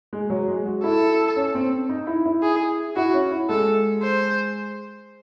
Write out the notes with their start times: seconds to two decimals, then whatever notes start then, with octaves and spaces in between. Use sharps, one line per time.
0.13 G#3
0.30 F#3
0.48 G#3
0.65 F#4
0.83 E4 A4
1.36 C#4
1.55 C4
1.89 D#4
2.07 E4
2.26 E4
2.43 G#4
2.96 E4 F#4
3.14 C#4
3.31 E4
3.49 G#3 A4
4.02 C5